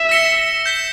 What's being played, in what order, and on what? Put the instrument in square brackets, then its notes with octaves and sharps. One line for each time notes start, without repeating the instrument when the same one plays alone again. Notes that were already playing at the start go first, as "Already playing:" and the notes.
Already playing: [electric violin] E5
[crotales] E6 A#6 C#7 E7 G7
G6 B6 G7